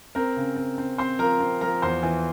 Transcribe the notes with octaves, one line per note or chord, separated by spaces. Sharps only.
C4 A#4 A#5
C#3
C4
C4
C4 C5 C6
F3 A#4 A#5
C4
F3 A#4 A#5
E2 C5 C6
E3